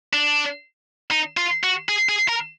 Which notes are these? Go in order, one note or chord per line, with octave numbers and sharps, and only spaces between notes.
D4
D#4
F4
F#4
G#4
G#4
A#4